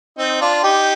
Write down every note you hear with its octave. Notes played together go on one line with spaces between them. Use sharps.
C4 D#4
D4 F4
D#4 G4